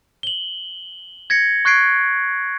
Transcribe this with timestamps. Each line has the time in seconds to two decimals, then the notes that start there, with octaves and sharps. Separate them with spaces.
0.23 F#7 G7
1.30 G#6 A#6 C#7
1.65 C#6 F#6 G#6 C7 D7